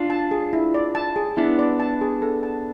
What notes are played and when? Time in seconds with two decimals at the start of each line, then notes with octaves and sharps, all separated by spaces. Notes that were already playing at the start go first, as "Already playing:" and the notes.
Already playing: D4 F4
0.10 A5
0.31 G#4
0.53 E4
0.74 D5
0.95 A5
1.16 G#4
1.37 B3 D4 E4
1.59 D5
1.80 A5
2.01 G#4
2.22 A4
2.43 A5